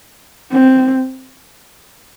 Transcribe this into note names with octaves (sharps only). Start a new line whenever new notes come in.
C4